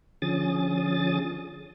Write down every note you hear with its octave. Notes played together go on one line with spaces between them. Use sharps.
D3 F3 C#4 G#4 D#6 A6